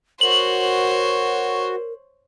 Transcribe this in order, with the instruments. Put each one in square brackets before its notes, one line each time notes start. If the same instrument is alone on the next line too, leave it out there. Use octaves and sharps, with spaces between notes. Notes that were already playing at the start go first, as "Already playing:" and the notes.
[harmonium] F#4 [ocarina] A#4 [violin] C5 C#5 [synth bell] F#7